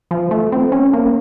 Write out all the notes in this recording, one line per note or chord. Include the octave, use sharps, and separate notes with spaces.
F3
A3
C4
C#4
A#3